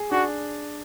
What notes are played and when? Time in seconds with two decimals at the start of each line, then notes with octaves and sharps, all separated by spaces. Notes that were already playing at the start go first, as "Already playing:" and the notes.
Already playing: G#4
0.11 D4 F#4